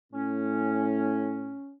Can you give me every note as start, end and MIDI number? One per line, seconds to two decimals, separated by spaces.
0.13 1.57 45
0.13 1.73 61